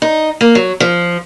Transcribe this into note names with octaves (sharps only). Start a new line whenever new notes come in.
D#4
A#3
F#3
F3